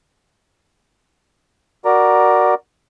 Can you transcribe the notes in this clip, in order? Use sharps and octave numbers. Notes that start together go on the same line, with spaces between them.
F#4 A#4 D5 A#5